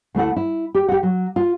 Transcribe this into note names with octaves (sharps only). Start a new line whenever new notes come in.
D2 A3 E4 F#5
E4
G4
G4 F#5
F#3
F4